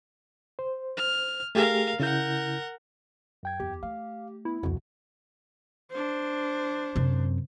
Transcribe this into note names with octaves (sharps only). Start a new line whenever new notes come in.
C5
F6
A3 G4 G#4 A#4 F5
C#3 E4 A#4 F#5 G6
F#2 G5 G#6
E2 G4
A3 F5
B3 E4
E1 C2 F2 F3 F#4
D4 C5
F#2 C3